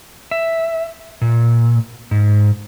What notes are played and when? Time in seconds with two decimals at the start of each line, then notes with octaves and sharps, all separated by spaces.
0.31 E5
1.21 A#2
2.11 G#2